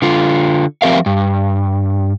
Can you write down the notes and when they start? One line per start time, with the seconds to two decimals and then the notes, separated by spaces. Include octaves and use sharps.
0.02 D3 F4
0.82 F3 C4 G4 A#4 E5 F5
1.06 G2